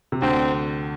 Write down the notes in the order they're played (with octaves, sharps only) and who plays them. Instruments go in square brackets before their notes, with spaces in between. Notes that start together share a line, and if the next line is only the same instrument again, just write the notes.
[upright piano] C3
[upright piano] D2 D3 [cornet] C4